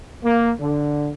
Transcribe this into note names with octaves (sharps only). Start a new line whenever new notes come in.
A#3
D3